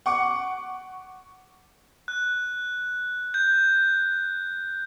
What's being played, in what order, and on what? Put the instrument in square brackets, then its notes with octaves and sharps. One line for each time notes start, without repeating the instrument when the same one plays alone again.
[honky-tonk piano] F#5 C#6 D6
[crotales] F#6
G6